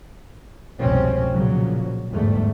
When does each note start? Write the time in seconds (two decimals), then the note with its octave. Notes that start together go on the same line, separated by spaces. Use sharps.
0.80 F1 C2 G#2 B2 C4 C#4
1.33 B1 A#2 C#3 F3 F#3
2.12 G1 E2 G#2 G3 A3